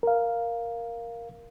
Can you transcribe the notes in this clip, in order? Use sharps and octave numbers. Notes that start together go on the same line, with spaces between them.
A#4 F5